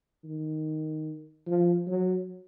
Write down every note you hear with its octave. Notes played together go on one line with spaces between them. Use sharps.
D#3
F3
F#3